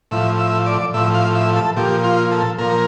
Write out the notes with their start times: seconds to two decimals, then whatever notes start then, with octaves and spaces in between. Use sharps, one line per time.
0.11 A2 F3 E5
0.39 E5
0.66 D5
0.94 A2 F3 E5
1.14 F5
1.35 E5
1.56 A4
1.76 A#2 F3 G4
2.04 F4
2.31 A4
2.58 A#2 F3 A#4